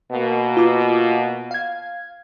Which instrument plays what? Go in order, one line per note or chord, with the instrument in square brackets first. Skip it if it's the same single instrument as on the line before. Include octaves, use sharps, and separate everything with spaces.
[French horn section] B2 A#3
[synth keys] F4 D6
F5 G#6